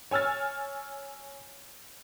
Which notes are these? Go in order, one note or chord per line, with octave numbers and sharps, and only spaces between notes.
C#5 G#5 E6 F6 A6